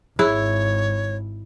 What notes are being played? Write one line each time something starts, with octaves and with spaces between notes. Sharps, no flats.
G#1 E4 G#4 C#5